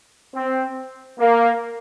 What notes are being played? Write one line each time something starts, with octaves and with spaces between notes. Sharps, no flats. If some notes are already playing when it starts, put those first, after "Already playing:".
C4
A#3